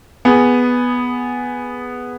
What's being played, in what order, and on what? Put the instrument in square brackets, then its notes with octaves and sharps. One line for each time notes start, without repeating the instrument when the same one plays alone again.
[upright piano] B3 G#4